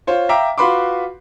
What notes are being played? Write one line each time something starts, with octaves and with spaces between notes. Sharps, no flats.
F4 C5 C#5
E5 F5 G5 A#5 D6
F4 F#4 B4 B5 C6 D6